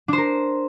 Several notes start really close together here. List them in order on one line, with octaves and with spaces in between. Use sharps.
D4 C5 A#4